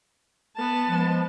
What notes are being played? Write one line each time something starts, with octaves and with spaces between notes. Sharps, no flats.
B3 A5
F3 G#3